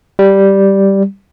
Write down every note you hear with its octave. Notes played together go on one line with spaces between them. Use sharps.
G3